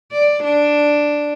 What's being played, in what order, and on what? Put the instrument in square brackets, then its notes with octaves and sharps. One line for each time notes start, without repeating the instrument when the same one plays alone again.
[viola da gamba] D5
D4